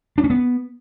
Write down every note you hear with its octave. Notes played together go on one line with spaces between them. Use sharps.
D4
C#4
B3